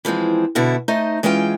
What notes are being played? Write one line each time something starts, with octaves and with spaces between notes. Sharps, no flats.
E3 F3 G#3 C4
B2 D3 E4 F#4
A3 D#4 C5 D#5
E3 G#3 C#4 F4 G5